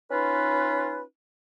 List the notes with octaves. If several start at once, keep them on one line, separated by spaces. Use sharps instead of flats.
C#4 D#4 F4 B4